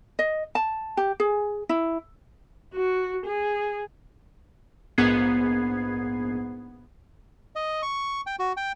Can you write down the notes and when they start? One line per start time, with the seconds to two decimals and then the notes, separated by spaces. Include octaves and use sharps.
0.19 D#5
0.55 A5
0.97 G4
1.20 G#4
1.69 E4
2.74 F#4
3.26 G#4
4.98 A#1 G#2 B3 G#4 G#6 C7
7.56 D#5
7.83 C#6
8.27 G5
8.39 F#4
8.57 G5